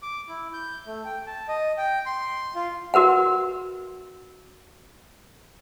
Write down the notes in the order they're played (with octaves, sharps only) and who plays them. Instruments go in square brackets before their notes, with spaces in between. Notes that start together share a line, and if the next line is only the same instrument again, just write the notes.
[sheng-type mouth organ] D6
E4
G6
A3
G5
A5
D#5
G5
C6
F4
[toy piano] F#4 A#4 B4 F#5